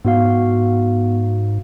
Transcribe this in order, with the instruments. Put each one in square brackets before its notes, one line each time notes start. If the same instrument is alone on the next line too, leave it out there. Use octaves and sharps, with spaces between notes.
[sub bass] G#2 [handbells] B3 F#4 F5